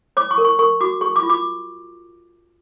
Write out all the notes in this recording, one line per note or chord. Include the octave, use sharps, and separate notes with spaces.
C#5 D6
C#6
A#4
C#6
A#4 C#6
F#4 D6
G#4 C#6
D6
F4
D6